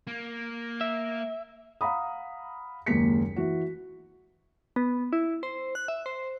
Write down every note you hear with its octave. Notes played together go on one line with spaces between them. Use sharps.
A#3
E5
F5 F#5 A#5 B5 D#6
F#1 D#2 G#3 A#3 B6 C#7
E3 F#4
B3
E4
C5
F#6
E5
C5